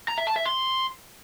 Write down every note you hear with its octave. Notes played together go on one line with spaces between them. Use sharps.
A#5
E5
A5
E5
C6